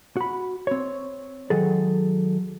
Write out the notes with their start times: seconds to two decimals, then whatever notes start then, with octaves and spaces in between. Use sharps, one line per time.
0.17 F#4 B5
0.67 C4 C#5
1.50 D#3 F#3 G#3 G#4 A4